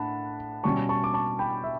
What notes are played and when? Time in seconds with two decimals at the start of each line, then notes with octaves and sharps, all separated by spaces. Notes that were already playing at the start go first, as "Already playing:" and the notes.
Already playing: A2 D4 F#5 A5 B5
0.64 B2 G3 C#4 A5 C#6
0.89 A5 C#6
1.04 D6
1.14 A5 C#6
1.39 G5 B5
1.64 E5